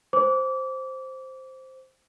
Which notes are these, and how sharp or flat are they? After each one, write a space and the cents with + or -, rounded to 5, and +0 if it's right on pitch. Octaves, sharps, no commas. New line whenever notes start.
C5 +0 D6 -25